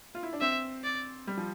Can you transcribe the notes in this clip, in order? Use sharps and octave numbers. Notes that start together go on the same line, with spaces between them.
F4
E4
D4
C4 E5
D5
G3
F3